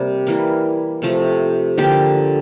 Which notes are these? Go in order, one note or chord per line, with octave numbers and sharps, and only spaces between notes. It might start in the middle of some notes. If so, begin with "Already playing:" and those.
Already playing: C3 G3 A#3 G4
E3 G3 A#3
C3 F3 A3
D3 F3 A#3 G4 G5